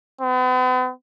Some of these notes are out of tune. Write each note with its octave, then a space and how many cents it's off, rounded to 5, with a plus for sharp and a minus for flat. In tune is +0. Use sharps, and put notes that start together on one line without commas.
B3 +45